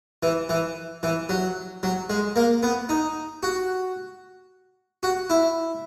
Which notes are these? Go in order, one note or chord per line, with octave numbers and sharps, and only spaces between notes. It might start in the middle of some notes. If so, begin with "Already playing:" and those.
E3
E3
E3
F#3
F#3
G#3
A#3
B3
D#4
F#4
F#4
E4